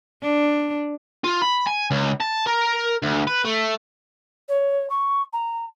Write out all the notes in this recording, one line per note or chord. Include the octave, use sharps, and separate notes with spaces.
D4
F4
B5
G#5
C#2
A5
A#4
D2
B4
A3
C#5
C#6
A#5